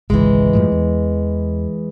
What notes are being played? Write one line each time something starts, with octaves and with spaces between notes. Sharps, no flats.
G#1 C#2 E3 G#3
F#2 A2 F3
E2